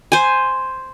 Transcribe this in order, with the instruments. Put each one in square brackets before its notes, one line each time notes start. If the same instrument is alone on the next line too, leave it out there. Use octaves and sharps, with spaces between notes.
[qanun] C5 G#5